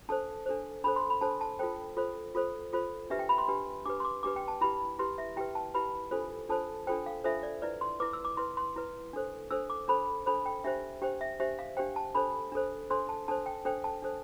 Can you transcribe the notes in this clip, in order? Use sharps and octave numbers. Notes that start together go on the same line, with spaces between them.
D4 A4 C5 A5
D4 A4 C5
D4 A4 C5 B5
C6
B5
D4 A4 C5 A5
A5
F4 A4 C5 G5
F4 A4 C5
F4 A4 C5
F4 A4 C5
D4 G4 B4 E5
G5
B5
C6
D4 G4 B4
D4 G4 B4 D6
C6
D6
D4 G4 B4 D6
G5
A5
E4 G4 B4 B5
E4 G4 B4 C6
E5
E4 G4 B4 G5
A5
E4 G4 B4 B5
D4 F4 A4 C5
D4 F4 A4 C5 A5
D4 F4 A4 C5 G5
F5
D4 F4 A4 C5 E5
D5
E4 B4 D5
C6
E4 B4 D6
E6
D6
E4 B4 C6
C6
E4 B4
D4 A4 C5
D4 A4 C5 E6
D6
D4 A4 C5 B5
D4 A4 C5 B5
G5
D4 G4 C5 E5
D4 G4 C5 G5
E5
D4 G4 C5 E5
F5
D4 G4 C5 G5
A5
D4 A4 C5 B5
D4 A4 C5
D4 A4 C5 C6
A5
D4 A4 C5 A5
G5
D4 A4 C5 G5
A5
D4 A4 C5